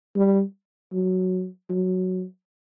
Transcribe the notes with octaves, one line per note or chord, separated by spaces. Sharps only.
G3
F#3
F#3